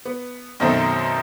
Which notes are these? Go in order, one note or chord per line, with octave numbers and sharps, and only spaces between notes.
B3
F#2 B2 D#3 A3 C4